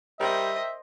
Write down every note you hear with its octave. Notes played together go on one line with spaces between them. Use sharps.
G3 A#4 C5 D#5 E5 G5